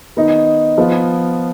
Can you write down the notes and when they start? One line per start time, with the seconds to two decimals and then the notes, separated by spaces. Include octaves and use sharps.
0.17 D#3 B3 D#4
0.78 F3 B3 F4